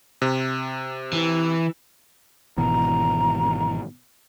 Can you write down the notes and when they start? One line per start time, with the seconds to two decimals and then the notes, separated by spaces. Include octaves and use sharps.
0.22 C3
1.13 E3
2.58 G#1 B2 E3 A#5